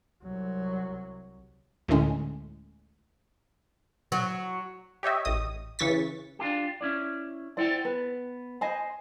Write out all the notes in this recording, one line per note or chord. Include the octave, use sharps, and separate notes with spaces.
C2 F#3
D2 A2 D3 G#3 C#4
F#3
G4 C#5 D#5 E5
A1 D#5 D#6
C#3 E3 C#6 A6 B6
D4 F4 G4
C#4 E4 D5
E4 C5 D5 F#5 G5
B3 B4
C5 D#5 G#5 B5